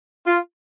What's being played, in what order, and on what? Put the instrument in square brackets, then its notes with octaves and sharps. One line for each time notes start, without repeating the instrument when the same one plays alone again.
[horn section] F4